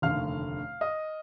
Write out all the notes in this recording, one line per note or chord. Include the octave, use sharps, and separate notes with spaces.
F1 D#2 D3 A3 F5 F6
D#5 D#6